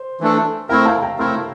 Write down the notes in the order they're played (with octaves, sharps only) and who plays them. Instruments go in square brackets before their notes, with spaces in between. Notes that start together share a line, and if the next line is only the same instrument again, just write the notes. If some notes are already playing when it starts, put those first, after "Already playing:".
Already playing: [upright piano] C5
[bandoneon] E3 A3 D4 A4
[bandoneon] A3 C4 E4 A#4 [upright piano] E5 G5
[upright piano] F5 A5
G5 A#5
[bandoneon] A3 C4 E4 A#4 [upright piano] C6 E6